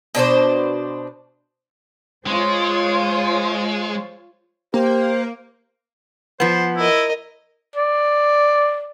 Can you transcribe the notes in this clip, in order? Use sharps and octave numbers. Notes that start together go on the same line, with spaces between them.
B2 D4 F#4 C5
G#3 F4 C5 C#5
A#3 G4 C5
F3 B3 C5
E4 A#4 D#5
D5